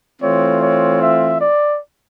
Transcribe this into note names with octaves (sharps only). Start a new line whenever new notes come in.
E3 A3 C4 F4 C#5
C#5
E5
D5